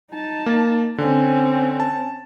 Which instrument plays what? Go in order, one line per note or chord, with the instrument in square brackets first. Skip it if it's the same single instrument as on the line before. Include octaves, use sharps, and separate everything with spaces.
[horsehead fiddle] D#4 A5
[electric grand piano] A#3
[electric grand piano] D3 [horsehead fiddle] C4 C#4
[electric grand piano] A5